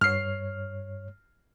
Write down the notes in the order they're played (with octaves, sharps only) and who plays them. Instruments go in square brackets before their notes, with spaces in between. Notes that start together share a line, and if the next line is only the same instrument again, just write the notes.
[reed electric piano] G2 C#5 [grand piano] F6 C7